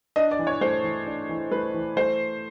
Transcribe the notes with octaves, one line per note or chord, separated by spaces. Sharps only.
D4 D#5
D5
E3
C#5
A3 C5
E3
D4
E3
A3 B4
E3
A3 C5